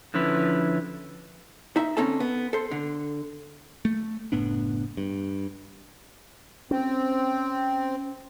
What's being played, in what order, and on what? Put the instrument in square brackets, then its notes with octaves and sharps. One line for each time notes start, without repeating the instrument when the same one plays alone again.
[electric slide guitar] D3 F3 C#4 E4 B4
[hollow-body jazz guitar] D#4 E5
D3 C4 C#4 D#4 A4 A5
B3
A4 C5
D3
[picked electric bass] A3
F#1 A2 B3 D4
G2
[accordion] C4 [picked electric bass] C#4